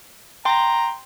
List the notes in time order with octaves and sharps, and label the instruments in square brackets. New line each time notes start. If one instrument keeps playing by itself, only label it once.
[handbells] G5 C6 [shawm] A#5